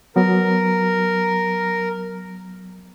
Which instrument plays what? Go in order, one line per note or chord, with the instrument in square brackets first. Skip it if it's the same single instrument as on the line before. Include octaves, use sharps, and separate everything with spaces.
[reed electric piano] F#3 B3 [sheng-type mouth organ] A#4